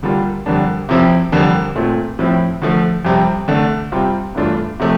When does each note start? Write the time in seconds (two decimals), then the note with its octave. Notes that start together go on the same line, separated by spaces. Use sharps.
0.03 D3 G3 A#3 D4 F4
0.46 F2 D3 G3 A#3 D4
0.89 C3 F3 C4 E4
1.32 F2 D3 G3 A#3 D4
1.75 A#2 A3 C4 F4
2.19 A2 F3 C4 E4
2.62 D3 F3 A3
3.05 F2 C3 G3 C4
3.48 D3 A3 D4
3.92 C3 G3 C4 F4
4.35 G2 E3 A3 D4 F4
4.80 C3 F3 A3